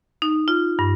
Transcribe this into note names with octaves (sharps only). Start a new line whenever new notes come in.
D#4
F4
G2